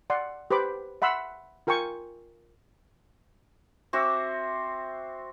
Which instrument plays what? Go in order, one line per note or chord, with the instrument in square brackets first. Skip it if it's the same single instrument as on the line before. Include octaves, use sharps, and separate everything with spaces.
[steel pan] D5 F#5 C6
G4 B4 C5 B5 D6
E5 F#5 B5 C6 E6
F4 A#4 G5 G#5 C#6
[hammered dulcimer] C4 F#4 E5 D6